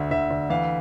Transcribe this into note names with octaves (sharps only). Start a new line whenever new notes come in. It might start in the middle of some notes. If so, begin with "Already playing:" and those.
Already playing: D2 D3 E5
D2 E5
D2
E3 F5